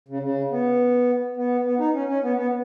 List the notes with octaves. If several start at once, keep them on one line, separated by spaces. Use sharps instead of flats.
C#3
C#3
B3
B3
B3
D#4
C#4
C#4
B3
B3